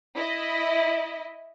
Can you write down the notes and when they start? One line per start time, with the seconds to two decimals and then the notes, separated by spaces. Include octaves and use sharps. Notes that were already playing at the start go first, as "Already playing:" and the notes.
0.16 E4 D#5